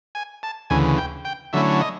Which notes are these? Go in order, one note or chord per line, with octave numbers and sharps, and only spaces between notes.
G#5
A5
D2 C#3 E3 G#5
G5
G5
D3 F#3 A3 C#4 E4 E5
D#5